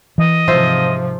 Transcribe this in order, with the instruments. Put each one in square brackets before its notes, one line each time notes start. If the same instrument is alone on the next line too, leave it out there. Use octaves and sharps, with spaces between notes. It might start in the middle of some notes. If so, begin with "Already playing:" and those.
[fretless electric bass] E3 [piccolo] D#5
[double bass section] G#2 C3 F3 [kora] F4 C5 E5